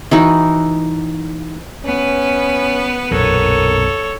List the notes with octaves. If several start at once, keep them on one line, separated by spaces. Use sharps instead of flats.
E3 D#4 F#4
B3 C#4 B4
B1 F#2 A#2 A4 A#4 C#5